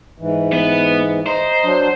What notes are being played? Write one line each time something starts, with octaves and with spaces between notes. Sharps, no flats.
G#2 E3
B3
C5 D#5 A#5
F#3 D4